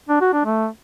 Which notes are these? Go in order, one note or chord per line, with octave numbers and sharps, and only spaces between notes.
D4
F#4
D4
A3